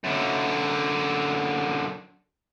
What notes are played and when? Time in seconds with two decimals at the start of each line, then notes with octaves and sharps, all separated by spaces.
0.04 F#2 D3